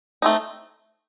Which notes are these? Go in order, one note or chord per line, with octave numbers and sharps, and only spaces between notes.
A3 C4 D#4